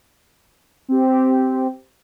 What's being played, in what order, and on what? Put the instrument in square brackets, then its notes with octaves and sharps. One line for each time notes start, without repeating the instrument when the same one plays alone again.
[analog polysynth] C4 G4